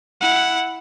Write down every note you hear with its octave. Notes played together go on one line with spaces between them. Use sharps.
E4 F#5